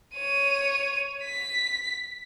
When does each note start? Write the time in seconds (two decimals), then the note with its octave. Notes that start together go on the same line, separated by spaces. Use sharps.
0.15 C#5 D#7
1.24 B6